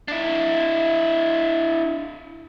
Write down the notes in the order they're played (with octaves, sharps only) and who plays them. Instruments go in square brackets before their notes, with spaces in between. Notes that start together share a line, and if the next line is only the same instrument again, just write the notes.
[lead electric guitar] D4 E4